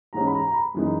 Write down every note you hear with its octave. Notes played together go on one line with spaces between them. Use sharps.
G#2 E3 G#3 C#4 A#5
B5
A#5
A#5
B5
F#2 E3 G#3 D#4